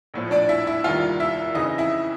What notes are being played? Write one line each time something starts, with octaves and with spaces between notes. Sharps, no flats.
A#1 A2 F3
D4 D5
E4 E5
E4 E5
F1 D#2 D#3 G3 F4 F5
E4 E5
F2 C#3 E3 D#4 D#5
E4 E5